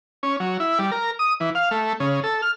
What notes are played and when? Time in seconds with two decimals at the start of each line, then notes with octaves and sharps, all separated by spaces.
0.23 C#4
0.40 F#3
0.60 E4
0.79 G3
0.92 A#4
1.19 D#6
1.40 E3
1.55 F5
1.71 A3
2.00 C#3
2.24 A4
2.42 F6